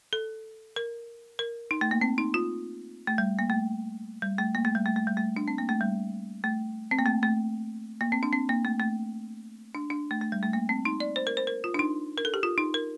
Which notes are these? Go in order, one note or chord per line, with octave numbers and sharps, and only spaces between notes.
A4
A#4
A#4
D#4
A3
A#3
C4
D#4
F4
A3
G3
A#3
A3
G3
A3
A#3
A3
G3
A3
A3
G3
A3
D4
C4
A#3
A3
G3
A3
C4
A#3
A3
A3
A#3
C4
D4
C4
A#3
A3
A3
D4
D4
A3
A3
G3
A3
A#3
C4
D#4
D5
C5
A#4
C5
A#4
F4
D4
D#4
A#4
A4
G4
F4
D#4
A#4